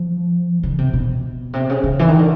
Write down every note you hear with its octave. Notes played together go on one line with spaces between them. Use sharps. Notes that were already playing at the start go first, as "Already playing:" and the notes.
Already playing: F3
C#3
C3
B2
C3
C#3
C#3
E3
D#3
D3